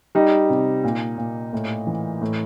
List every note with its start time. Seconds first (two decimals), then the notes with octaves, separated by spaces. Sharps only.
0.15 G3 D#4
0.49 C3
0.84 A#2
1.18 A#2
1.53 A2
1.87 E3
2.21 A2